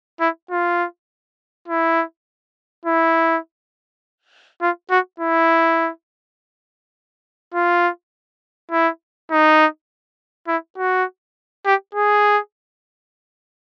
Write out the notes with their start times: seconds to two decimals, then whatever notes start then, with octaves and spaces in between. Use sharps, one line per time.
0.20 E4
0.50 F4
1.68 E4
2.85 E4
4.61 F4
4.90 F#4
5.20 E4
7.54 F4
8.71 E4
9.31 D#4
10.48 E4
10.78 F#4
11.66 G4
11.95 G#4